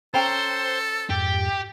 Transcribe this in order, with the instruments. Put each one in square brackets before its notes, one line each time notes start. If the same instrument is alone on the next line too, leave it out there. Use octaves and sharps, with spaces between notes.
[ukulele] C#4 G5 A#5 [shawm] A4 [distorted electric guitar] C5
[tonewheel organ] F2 G#2 [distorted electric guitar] G4